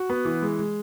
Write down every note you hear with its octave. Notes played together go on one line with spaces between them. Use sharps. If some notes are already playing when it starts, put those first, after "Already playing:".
Already playing: F#4
B3
E3
G#3
G#3